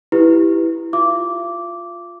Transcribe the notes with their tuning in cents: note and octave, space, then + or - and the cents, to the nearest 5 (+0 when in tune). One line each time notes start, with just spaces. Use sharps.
E4 +0 G4 +0 B4 +0
F4 +10 F5 -45 D6 -10